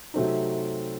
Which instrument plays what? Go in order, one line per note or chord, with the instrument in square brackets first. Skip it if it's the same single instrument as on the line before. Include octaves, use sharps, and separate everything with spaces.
[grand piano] C3 F#3 A3 C4 D#4